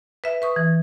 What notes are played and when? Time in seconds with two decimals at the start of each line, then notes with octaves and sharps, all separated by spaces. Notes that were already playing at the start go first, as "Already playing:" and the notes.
0.24 B4 E5
0.42 B4 C#6 D#6
0.56 E3